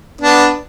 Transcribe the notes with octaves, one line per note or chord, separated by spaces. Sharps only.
B3 D4